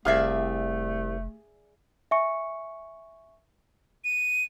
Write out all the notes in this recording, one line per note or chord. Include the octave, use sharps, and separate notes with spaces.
F1 C2 A3 G#4 D5 E5 F5
E5 G#5 C#6 C#7
D#7